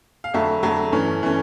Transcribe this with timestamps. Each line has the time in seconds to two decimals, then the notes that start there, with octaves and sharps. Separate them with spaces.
0.24 F5
0.34 F2 D3 F#3 A3 E5
0.63 F2 D3 F#3 A3
0.92 G2 E3 A3 C#4
1.23 E3 A3 C#4